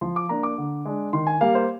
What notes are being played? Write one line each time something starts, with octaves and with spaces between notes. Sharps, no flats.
F3 C6
D6
A#3 D4 A#5
D6
D3
G#3 D4
D#3 C6
G#5
G3 A#3 F5
C5